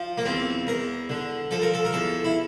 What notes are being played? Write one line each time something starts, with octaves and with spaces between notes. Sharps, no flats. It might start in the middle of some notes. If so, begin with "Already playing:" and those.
Already playing: F3
A#3
E2 C4
E2 A#4
D3
F3 A4
A#4
A4
A#4
E2 A4
E4